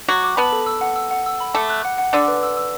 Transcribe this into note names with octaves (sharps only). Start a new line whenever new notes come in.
F#3 F#4 D6
D6
B3 B4 A5
A4
E6
F#5
E6
F#5
E6
B5
A3 A4 D6
F#6
F#5
F#5
D3 D4 E6
B4
E6
E6